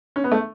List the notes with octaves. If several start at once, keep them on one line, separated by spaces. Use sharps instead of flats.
C#4
B3
A3